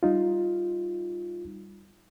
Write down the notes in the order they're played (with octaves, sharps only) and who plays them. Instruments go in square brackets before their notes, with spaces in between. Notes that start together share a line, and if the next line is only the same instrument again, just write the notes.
[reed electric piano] G3 D#4 F4